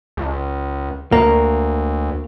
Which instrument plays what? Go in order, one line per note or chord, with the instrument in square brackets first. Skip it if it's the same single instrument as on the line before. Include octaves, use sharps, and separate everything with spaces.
[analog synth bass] C#2
[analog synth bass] D2 [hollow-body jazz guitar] A#3